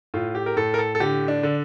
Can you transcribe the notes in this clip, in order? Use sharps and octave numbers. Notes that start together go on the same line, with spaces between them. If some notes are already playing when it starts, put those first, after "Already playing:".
A2 F4
G4
A#4
A2 A4
A#4
A4
A4
D3 G4
D4
D3